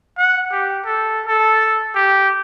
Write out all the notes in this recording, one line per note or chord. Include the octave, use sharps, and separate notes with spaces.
F#5
G4
A4
A4
G4